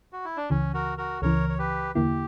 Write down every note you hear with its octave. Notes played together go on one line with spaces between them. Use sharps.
F#4
E4
D4
C#2 C#3 E3 C#4
F#4 A#4
F#4 A#4
C#2 C#3 E3 A#4 C#5
C#5
G4 B4
E2 D3 A#3 E4 G4